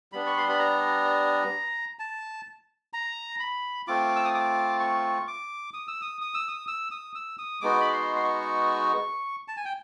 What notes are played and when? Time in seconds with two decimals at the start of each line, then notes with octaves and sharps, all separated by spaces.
0.12 G3 B3 D4 B5
0.27 C#6
0.37 C6
0.49 B5
0.59 A#5
1.99 A5
2.93 A#5
3.40 B5
3.87 A3 C4 F4 D6
4.16 E6
4.25 D#6
4.34 D6
4.80 C#6
5.28 D6
5.74 D#6
5.88 E6
6.02 D#6
6.22 D#6
6.34 E6
6.48 D#6
6.68 E6
6.91 D#6
7.15 E6
7.38 D#6
7.61 G#3 B3 D#4 F#4 D6
7.81 B5
7.93 C6
8.16 C6
8.24 C#6
9.48 A5
9.57 G#5
9.65 G5